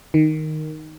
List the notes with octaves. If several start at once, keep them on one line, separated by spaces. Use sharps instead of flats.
D#3